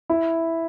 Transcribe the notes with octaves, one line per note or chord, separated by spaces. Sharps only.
E4